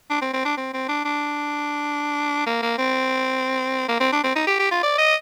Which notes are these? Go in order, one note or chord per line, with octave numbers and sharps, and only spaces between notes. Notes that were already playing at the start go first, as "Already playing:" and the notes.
D4
C4
C4
D4
C4
C4
D4
D4
A#3
A#3
C4
A#3
C4
D4
C4
D#4
G4
G4
F4
D5
D#5